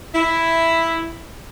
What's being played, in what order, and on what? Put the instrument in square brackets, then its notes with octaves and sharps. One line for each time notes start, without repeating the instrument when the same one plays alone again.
[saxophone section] E4